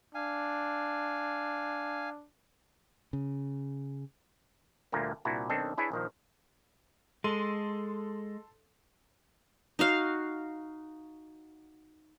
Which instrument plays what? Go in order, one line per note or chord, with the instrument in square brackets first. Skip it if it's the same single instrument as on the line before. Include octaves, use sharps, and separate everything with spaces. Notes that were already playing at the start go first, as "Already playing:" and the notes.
[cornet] D4 [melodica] F5 G#5
[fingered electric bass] C#3
[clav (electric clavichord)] D2 G2 A#2 A3 A#3
C2 A#2 D4 E4 F#4
B1 D#3 C4 D4 A4 D#5
D4 E4 G#4 B4 C#5 E5
A#1 D#3 F3
[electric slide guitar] G#3 [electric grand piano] A4 C6 D#7
[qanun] D#4 F#4 F5